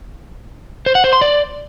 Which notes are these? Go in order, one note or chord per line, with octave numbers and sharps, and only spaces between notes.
C5
F#5
C5
C6
D5